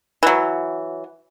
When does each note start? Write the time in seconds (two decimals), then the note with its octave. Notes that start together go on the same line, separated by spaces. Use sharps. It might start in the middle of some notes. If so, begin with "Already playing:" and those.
0.23 E3 F#3